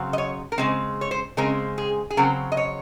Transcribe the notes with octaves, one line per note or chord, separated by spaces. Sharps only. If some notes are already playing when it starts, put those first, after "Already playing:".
Already playing: C#3 F#3 C4
D#5
C#5
A#4
C#3 G#3 C4 C5
C#5
C5
C#3 G#3 C4 A#4
G#4
G#4
C#3 F#3 C4 A#4
D#5
C#5